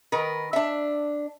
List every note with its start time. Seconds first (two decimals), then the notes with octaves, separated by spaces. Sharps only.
0.12 D#3 A#4 B4
0.53 D4 E5